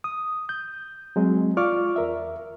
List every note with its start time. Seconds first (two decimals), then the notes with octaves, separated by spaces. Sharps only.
0.04 D#6
0.49 G6
1.16 F#3 G#3 C4
1.57 F4 D5 C#6 D6 F6
1.96 E2 A#4 E5